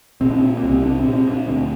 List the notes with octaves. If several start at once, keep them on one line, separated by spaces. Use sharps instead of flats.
A#2 C4
D4
C4
A#2
C2
C4
C2 D4
C4
A#2
C4
A#2
D4
D2 C4